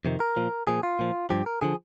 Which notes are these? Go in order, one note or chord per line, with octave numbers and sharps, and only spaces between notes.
F2 C3 D#3
A#4
A#2 F3
A#2 F3 G#4
F4
A#2 F3
G2 F3 G4
A#4
D3 F3 G#4